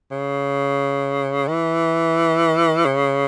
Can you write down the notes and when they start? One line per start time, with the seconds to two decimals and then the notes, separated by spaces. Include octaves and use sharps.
0.11 C#3
1.48 E3
2.85 C#3